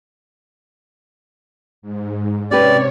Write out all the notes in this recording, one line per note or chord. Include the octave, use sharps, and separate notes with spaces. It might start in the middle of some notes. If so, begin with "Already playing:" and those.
G#2
C3 C#4 G4 B4 C#5 D5